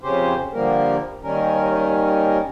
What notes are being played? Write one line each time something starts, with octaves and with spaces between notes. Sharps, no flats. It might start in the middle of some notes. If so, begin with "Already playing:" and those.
F2 C#3 C#4 G4 C5
D3 F3 G3 A#3 A#4
D#2 D#3 G3 C#4 A#4